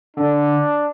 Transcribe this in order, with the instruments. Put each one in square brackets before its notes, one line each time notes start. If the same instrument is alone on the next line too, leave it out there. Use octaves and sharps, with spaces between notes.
[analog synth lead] D3 [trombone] D4